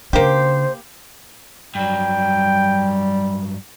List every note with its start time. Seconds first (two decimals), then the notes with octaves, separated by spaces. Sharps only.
0.13 C#3 A#3 D4 G4 C5
1.75 G2 F#3 G3 G5